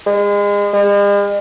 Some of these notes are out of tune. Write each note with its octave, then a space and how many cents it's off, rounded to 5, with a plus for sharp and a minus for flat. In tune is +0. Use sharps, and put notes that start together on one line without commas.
G#3 -30
G#3 -45